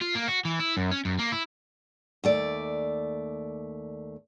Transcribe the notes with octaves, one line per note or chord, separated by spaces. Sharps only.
F4
A#3
F#4
E3
E4
F#2
C#4
F#2
A#3
E4
D#2 A3 D5